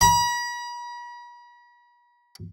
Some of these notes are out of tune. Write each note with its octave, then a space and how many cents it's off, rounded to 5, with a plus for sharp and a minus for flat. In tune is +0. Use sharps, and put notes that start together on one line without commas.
B5 -45